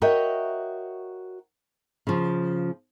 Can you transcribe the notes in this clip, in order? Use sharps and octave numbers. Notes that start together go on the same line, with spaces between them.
F#4 A#4 C#5 D#5 E5 G5
C#3 F3